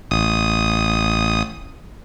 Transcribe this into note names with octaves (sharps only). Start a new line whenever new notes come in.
A1 D#6